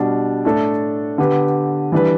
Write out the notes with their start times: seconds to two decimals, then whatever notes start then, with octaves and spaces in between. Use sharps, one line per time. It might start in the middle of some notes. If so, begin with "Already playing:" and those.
Already playing: B2 G3 D4
0.45 A2 A3 D4 A4
1.18 D3 B3 G4 B4
1.92 E3 G3 D4 B4